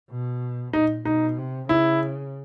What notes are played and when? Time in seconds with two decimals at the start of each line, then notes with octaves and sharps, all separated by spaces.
0.10 B2
0.73 A#2 D#4
1.05 B2 D#4
1.38 C3
1.69 C#3 E4